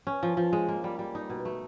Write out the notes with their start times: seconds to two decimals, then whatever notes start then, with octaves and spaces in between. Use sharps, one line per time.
0.07 C#4
0.23 F3
0.37 F3
0.53 G#3
0.68 A#3
0.84 G3
0.99 G3
1.15 D#4
1.30 B2
1.45 A3